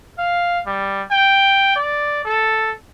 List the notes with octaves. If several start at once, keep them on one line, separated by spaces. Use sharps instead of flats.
F5
G3
G5
D5
A4